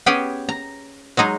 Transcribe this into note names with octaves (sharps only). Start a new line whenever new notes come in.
B3 C#4 G4 G#4 G5 G#5
A#5
F#3 G#3 D#4 G#4